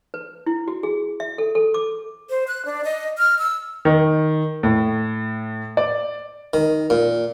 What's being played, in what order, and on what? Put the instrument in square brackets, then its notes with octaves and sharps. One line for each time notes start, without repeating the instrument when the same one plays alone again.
[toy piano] B4
E4
F#4
G#4
E5
A4
A4
D6
[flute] C5
F#6
D4
D#5
F6
E6
[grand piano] D#3
A2
D5
[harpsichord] D#3
A#2